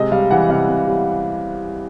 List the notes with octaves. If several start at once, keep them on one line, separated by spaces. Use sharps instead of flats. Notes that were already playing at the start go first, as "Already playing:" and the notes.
Already playing: C3 G#3 D#5
G3 F5
E3 F#5
C3 F5
C3
G3